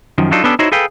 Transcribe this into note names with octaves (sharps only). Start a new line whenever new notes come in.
F#2 D#3 F3
F#3 D4 D#4 F4 A4
B3 C#4 D4 G4 A4
D#4 E4 F#4 C5 C#5 D#5
G#4 A4 B4 F5 G5